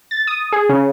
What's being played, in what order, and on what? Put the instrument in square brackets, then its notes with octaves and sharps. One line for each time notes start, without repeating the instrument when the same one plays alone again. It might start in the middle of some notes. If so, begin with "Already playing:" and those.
[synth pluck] A6
D#6
G#4
C#3